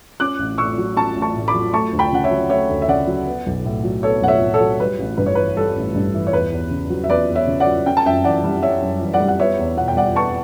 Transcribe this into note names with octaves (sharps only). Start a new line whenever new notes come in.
C#4 D6 F#6
A1
A2 C#6 E6
F#3
C#4 A5 C#6
A1
A5 C#6
A2
B5 D6
F#3
A3 A5 C#6
D2
G5 B5
C#3 F#5
C#5 E5
F#3
A3 C#5 E5
D2
E5
C#3 D5 F#5
F#3
B3
B1
A2
F#3
B3 A4 C#5
B1 F#5
C#5 E5
A2
A4 C#5
F#3
G3 B4
A1
G2 B4
C#5
E3 B4
G3 A4
A1
G2
E3
C#5
E2 B4
E2
C#3
F#3
E5
E2 B4 D5
E2
C#5 E5
C#3
D5 F#5
F#3
C#4 G5
A5
F#2 E5 G5
E3 D5 F#5
G3
C#4 C#5 E5
F#2
E3
D5 F#5
G3
F#5
B3 C#5 E5
E2
B2 F#5
G5
G3 D5 F#5
B3 A5 C#6